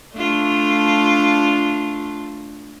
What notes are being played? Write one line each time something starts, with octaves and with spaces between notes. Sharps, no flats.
A3 D4 F4